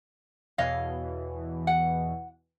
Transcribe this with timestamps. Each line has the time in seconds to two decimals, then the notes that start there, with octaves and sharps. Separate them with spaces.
0.58 E2 B2 E3 C#5 D#5 F5
1.67 F#5